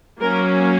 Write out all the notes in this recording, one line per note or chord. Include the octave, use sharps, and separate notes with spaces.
F#3 A#3 C#4 A#4